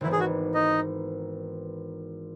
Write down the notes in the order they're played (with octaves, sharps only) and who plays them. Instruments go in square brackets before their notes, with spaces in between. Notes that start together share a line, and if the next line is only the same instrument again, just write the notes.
[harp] G#1 G#2 E3 B3 [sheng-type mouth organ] E4
[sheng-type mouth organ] G#4
F#4
D#4 D#5